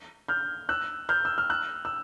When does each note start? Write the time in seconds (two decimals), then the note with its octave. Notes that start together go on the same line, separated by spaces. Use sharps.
0.28 F6 G6
0.69 E6 F#6
1.09 F6 G6
1.25 E6
1.38 F6
1.50 E6 F#6
1.85 E6